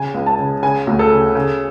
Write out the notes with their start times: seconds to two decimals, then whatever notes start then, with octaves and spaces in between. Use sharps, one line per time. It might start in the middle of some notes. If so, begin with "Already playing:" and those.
Already playing: C#3 G#5
0.14 C#2
0.26 A5
0.39 C#3
0.63 C#3 G#5
0.87 D2
0.99 A4
1.12 C#3
1.35 C#3